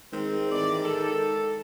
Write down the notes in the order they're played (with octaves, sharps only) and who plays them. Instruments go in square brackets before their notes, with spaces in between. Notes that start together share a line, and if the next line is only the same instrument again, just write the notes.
[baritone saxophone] D#3 [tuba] G#3 [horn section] C4
[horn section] A2 E3 D5
A4